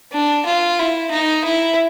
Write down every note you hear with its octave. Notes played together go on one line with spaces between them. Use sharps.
D4
F4
E4
D#4
E4